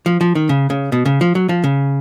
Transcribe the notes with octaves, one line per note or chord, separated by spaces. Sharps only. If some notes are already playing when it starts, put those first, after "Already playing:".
F3
F3
D#3
C#3
C#3
B2
C#3
F3
F#3
F3
C#3